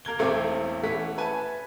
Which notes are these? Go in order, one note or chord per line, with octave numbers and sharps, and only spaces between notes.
A#3 A#4 G#6 G7
E1 B1 A3 C4 E4 D6
E3 A3 C#4 F#5 B6
B4 G#5 A5